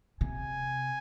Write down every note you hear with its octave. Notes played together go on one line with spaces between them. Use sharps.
C3 G#5